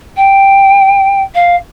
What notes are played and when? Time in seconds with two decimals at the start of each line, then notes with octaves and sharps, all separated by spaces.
0.17 G5
1.35 F5